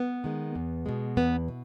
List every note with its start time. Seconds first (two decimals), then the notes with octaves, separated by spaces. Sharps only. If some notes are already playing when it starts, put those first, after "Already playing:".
Already playing: B3
0.24 D#3 G#3
0.56 E2
0.86 B2 G#3
1.17 E2 B3
1.48 B2